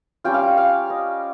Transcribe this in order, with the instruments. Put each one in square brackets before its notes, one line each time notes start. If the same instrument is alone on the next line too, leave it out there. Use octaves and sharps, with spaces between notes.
[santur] G3 C#4 F4 G5
F5
G5
F5
D#5